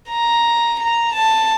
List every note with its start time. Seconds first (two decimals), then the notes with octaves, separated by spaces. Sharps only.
0.09 A#5
0.80 A#5
1.14 A5